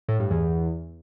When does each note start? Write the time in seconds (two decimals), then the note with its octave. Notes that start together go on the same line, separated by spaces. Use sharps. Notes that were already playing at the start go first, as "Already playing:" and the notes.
0.08 A2
0.20 G2
0.31 E2